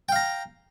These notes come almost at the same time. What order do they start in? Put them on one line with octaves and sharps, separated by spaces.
G5 F5 A#5